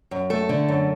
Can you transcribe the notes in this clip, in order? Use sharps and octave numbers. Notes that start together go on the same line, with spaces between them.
F#2
A3 A4
D3
F#2